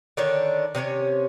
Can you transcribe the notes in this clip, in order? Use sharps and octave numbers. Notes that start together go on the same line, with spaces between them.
D3 D#3 D4 C#5
C3 C#4 D4 C#5